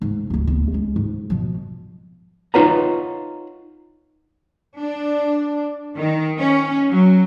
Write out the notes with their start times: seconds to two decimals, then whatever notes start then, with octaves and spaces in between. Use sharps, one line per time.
0.02 G#2
0.30 D1 D2
0.47 D2 B3
0.72 G#3 C#4
0.96 G#2
1.30 B2 F3
2.54 D#4 F4 B4 C#5 F#5 A#5
4.79 D4
5.96 D#3
6.38 C#4
6.88 F#3